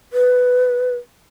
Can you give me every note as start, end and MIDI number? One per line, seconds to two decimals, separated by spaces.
0.13 0.95 71